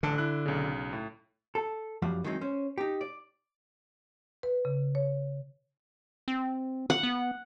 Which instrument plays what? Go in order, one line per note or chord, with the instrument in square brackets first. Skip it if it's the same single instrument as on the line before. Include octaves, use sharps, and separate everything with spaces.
[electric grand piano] A1 A5 [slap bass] D3
[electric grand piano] E4 F#6
B1 C#3
A2
[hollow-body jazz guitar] A4
F#2 F3 G3 F4 F#5
D#3 E3 F#3 G#3 C4 D#4
C#4 C5
D#4 G4
D5
[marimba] B4
C#3
C#5
[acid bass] C4
[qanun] F#5
[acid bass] B3